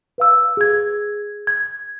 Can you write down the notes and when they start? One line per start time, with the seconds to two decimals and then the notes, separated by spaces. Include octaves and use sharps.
0.18 B4 F5 E6
0.57 G#4 G#6
1.47 G#6